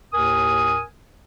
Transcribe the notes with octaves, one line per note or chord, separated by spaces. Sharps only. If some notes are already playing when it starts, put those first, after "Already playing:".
D#2 A2 A#4 G#5 D#6